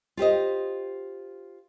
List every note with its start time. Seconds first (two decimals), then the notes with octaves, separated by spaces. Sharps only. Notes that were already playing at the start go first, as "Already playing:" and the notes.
0.17 F4 G4 C5 D#5